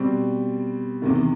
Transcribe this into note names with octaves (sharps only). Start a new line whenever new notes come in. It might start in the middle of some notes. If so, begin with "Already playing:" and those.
Already playing: B2 G3 C4
E2 C3 D#3